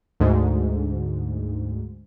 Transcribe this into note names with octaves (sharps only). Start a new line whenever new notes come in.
D2 G#2